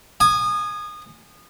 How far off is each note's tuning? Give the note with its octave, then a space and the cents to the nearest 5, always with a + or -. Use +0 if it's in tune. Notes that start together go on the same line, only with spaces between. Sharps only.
G#5 +5 D#6 -25